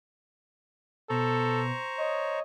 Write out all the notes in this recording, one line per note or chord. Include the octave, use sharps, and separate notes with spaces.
B2 A4 C5 A#5 C#6
C#5 D#5